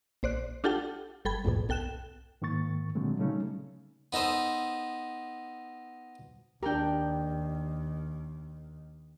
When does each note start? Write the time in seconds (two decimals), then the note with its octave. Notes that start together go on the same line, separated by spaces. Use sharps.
0.23 A#1 C5 D5 F#6
0.64 D4 F4 G4 A4 F#5 G5
1.25 G1 A4 G5 B5 G#6
1.45 A#1 F2 G#2 B2
1.69 B1 A4 G5 F#6 E7
2.42 G#2 D#3 A#3 C#6 A6
2.95 A#2 D3 F#3 G#3 A3 C4
3.19 C#3 F#3 G3 A3 C#4 D#4
4.13 B3 D#4 A4 C5
6.63 D#2 D4 G4 A#4 D5 G5